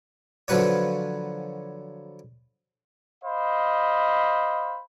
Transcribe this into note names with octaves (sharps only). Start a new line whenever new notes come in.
D3 F3 F#3 B4 C#5
C5 D#5 F5 B5